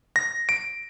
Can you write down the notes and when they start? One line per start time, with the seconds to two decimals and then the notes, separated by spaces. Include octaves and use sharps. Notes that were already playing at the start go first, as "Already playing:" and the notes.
0.16 A#6
0.49 D7